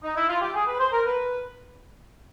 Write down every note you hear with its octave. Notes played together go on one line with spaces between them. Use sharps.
D#4
E4
F4
G4
G#4
B4
C5
A#4
B4